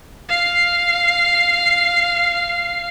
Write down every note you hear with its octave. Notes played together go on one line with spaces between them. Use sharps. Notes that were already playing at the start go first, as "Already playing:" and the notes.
F5 C7